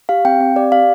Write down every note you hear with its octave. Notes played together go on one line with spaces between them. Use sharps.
G4 F5
C4 G5
C4 F5
G4 D5
G4 F5